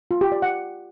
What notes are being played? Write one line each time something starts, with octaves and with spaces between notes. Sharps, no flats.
F4
G4
D5
F#5